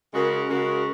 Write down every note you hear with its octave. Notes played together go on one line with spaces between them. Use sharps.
C#3 G#3 F#4 A#4
C#3 G#3 F#4 A#4